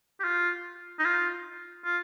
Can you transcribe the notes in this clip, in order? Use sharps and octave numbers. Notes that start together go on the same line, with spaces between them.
G4
F4
D#4
F4
F4